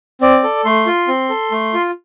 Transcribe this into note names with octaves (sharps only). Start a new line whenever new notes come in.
C4 D5
A4
A3 C6
F4
C4
A4
A3
F4